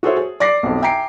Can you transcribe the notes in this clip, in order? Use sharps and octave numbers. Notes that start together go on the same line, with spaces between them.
F#4 G#4 A4 C5 C#5 E5
G#4
D5 D6 A#6 C7
B1 F2
E5 G5 G#5 A#5 C7 D7